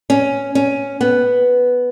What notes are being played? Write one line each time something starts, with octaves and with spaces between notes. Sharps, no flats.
C#4
C#4
B3